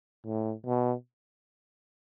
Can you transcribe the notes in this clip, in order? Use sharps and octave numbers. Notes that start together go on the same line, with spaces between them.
A2
B2